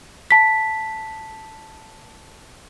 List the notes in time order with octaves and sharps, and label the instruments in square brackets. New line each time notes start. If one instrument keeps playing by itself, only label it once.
[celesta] A5 B6